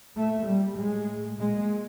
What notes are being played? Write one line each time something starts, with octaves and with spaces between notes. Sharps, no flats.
A#2 A3
G3
A2 G#3
A#2 G#3